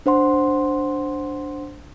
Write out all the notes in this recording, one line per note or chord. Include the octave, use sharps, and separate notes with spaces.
D4 C5 F#5 C6